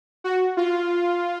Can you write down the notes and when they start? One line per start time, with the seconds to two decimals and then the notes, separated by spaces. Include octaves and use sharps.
0.24 F#4
0.57 F4